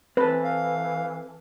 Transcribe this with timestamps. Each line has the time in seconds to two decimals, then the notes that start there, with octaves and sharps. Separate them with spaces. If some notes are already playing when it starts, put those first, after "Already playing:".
0.17 E3 C4 A4 B4
0.44 F5